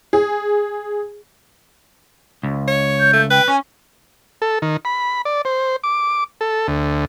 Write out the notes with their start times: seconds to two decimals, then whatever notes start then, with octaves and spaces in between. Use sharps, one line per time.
0.13 G#4
2.43 C#2
2.68 C#5
3.00 G6
3.13 A3
3.31 B4 G5
3.48 C#4 G#5
4.42 A4
4.62 D#3
4.85 B5
5.25 D5
5.45 C5
5.84 D6
6.41 A4
6.68 D2